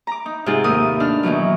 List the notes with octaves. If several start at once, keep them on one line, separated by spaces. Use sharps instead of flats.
A#5 D6
D#4
G#2 C3 C4 D#4 F4 G#4
D#2 A2 A#4 D#6
D4 D#4 F6
B2 D#3 E3 F#3